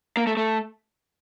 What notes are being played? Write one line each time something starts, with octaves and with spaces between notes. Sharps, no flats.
A#3
A3
A3